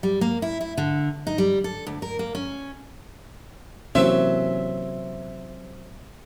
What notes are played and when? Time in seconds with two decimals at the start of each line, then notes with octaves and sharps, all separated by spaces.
0.03 G3
0.21 A#3
0.42 E4
0.61 E4
0.77 D3
1.27 D#4
1.38 G3
1.64 A4
1.87 D2
2.02 A#4
2.19 A#3
2.35 C#4
3.95 C3 E3 F#3 A#3 C4 C#4 E5